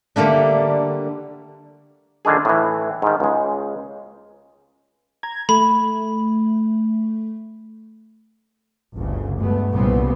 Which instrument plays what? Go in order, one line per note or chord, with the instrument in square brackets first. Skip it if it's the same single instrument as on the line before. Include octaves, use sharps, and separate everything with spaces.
[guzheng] D3 G3 A3 A#3 D4
[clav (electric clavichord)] A#1 D3 D#3 D4 G#4
A2 E3
G#2 D#3
C#2 G#3
[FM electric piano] A#5 G#6
[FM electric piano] A3 [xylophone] B5
[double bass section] G1 D2 C#3
G2 G#3 A3 B3
C2 A#2 C#3 G3 B3 C4